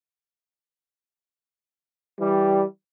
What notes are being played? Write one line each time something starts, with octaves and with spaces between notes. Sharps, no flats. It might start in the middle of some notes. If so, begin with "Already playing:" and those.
E3 G3